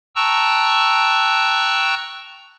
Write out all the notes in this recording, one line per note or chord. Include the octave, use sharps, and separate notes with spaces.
G5 A5 A#5 C#6 E6 F#6